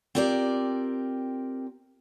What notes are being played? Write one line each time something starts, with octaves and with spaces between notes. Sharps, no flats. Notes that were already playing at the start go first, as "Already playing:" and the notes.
C4 F4 G4 A#4 D5